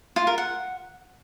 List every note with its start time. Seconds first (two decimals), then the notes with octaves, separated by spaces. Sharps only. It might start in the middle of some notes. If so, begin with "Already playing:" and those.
0.16 F4
0.27 A#4
0.38 F#5